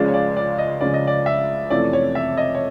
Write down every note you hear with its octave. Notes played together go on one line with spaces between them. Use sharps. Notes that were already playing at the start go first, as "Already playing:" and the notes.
Already playing: C#2 C#3 F3 G#3 D5
C#5
D5
D5
D#5
C#2 C#3 F3 G#3 D5
D#5
D5
E5
F2 C3 E3 A3 C#4 D5
C#5
E5
D#5
C#5